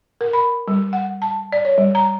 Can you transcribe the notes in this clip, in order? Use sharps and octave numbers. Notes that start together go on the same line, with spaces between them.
A#4
B5
G3
F#5
A5
D5
C#5
G3
A#5